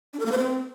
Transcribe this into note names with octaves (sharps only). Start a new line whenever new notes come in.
D4
A#4
A#3
C5
C4